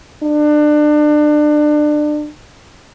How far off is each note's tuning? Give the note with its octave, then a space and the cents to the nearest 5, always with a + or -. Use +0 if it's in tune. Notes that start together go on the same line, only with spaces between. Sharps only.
D4 +30